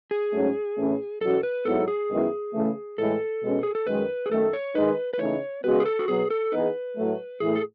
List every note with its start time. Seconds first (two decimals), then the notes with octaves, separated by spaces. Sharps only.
0.11 G#4
0.32 G#2 F#3 A3 C#4
0.77 A2 E3 A3 C#4
1.21 E2 B2 F#3 C#4 F#4 A4
1.43 B4
1.65 G#2 F#3 B3 E4 A4
1.88 G#4
2.09 F#2 D#3 G#3 B3 E4
2.53 C#3 E3 A3
2.98 A2 E3 G#3 A4
3.42 B2 G#3 C#4
3.63 G#4
3.75 A4
3.87 F#2 D#3 G#3 B4
4.26 G#4
4.30 F#2 D#3 A3 A4
4.53 C#5
4.75 D#3 G#3 D#4 B4
5.13 B4
5.19 C#3 E3 A3 D#4 C#5
5.63 C#3 G#3 B3 F#4 B4
5.80 G#4
5.86 A4
5.99 F#4
6.08 B2 F#3 B3 G#4
6.30 A4
6.52 E3 B3 D#4 G#4 B4
6.97 A2 F#3 A3
7.40 A2 E3 A3 G#4
7.55 A4